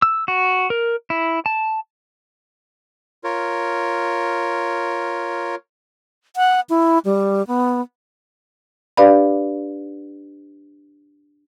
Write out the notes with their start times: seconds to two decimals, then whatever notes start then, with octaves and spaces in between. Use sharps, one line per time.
0.02 E6
0.28 F#4
0.70 A#4
1.10 E4
1.46 A5
3.24 F4 A#4 C#5
6.36 F#5
6.70 E4
7.05 G3
7.47 B3
8.97 D4 G4 B4 D5 F5 B5